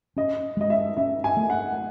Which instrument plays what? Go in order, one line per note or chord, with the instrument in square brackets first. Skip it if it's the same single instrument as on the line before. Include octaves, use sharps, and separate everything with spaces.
[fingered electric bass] C#4 [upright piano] D#5
[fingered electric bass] G#3 [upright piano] D#5
[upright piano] E5
[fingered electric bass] C#4 [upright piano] E5
[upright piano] G#5
[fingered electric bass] A3
[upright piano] F#5